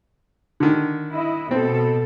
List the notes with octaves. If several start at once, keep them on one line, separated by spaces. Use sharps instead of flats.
D3 D#3
E4 D#5
B2 C4 A4